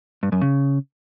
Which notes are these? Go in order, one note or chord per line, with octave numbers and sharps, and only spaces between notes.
G2
F#2
C#3